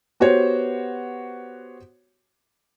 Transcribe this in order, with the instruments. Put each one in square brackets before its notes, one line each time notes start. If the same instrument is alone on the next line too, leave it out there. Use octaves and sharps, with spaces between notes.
[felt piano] B3 F#4 G4 C5 C#5